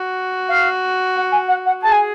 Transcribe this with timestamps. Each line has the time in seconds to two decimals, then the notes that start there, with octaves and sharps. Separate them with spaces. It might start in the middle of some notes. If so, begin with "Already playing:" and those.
Already playing: F#4
0.49 F5
1.16 F#5
1.32 G#5
1.48 F#5
1.66 F#5
1.82 G#4 A5
1.92 G#5